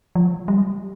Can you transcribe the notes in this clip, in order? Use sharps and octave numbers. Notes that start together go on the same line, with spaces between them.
F3
G3